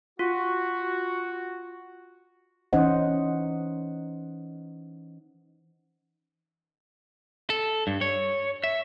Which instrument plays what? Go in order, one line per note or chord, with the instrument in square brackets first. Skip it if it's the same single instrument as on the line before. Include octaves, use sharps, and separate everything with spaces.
[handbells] F4 [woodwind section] F#4
[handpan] E3 C#4 D#4 C5 D#5 F#5
[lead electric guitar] A4
G2
C#5
E5